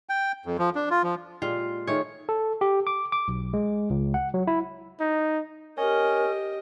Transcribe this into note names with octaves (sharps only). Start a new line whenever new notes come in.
G5
F2
F3
D4
F4
F3
A#2 G#3 F4 G4
D#3 A3 G#4 C#5
A4
G4
D6
D6
B1
G#3
C#2
F#5
F#3
E4
D#4
C#4 G4 A#4 D#5